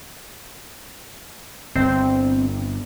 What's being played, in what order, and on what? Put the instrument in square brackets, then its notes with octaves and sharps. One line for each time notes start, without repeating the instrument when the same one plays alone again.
[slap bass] G1 [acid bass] C4